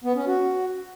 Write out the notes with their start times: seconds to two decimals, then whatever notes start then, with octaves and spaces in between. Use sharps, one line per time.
0.04 B3
0.16 C#4
0.27 F#4